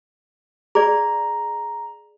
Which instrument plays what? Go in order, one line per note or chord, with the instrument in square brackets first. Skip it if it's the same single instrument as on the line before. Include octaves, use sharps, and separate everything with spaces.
[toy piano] G#4 D5 [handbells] A#5